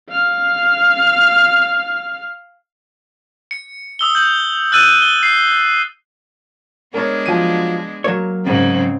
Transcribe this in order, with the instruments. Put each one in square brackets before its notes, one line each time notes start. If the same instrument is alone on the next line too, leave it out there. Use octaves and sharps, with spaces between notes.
[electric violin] F5 F6
[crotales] C#7
D#6 E6 G7
G6 F#7
E6 F#6 A6 D#7 F#7
G7
C7
[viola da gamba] G#3 B3 D4 [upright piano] A#4 C#5
[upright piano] F3 F#3 D#7
[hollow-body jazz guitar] F#3 C#5 [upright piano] A#3
[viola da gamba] G#2 C#3 C4